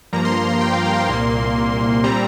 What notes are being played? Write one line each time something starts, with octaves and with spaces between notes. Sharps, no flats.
G2 F3 A#3 A#5
C6
A#5
G5
F5
A#5
C6
C2 A#2 A#3 C6
A#2 G3 C4 A#5